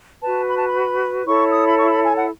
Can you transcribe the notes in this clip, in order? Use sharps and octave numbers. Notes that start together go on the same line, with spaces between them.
F#4 B4 A5
B5
A5
B5
E4 A4 C#5 C#6
D#6
B5
C#6
B5
G#5
F#5